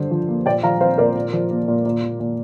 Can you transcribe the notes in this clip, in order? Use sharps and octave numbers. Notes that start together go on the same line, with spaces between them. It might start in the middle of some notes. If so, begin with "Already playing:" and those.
Already playing: G2 D3 C5
F3
A#3
A#2 D5 G5
F3 F5 A#5
C4 C5 F5
A#2 A#4 D5
A#2
F3
A#3
A#2
A#2
A#3
A#2